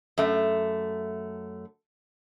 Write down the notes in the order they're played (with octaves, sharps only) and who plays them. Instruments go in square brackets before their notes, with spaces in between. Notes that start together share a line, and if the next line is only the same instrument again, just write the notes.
[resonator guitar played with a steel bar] F#2 A3